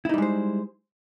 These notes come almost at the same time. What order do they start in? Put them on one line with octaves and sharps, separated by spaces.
E4 D#4 G3 G#3 C5